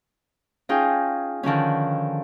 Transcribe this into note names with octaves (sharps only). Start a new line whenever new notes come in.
C#4 D#4 F4 G#4 G5
D3 D#3 F3 C#4